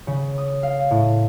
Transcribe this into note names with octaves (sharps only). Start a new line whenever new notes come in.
C#3
D#6
F5
A2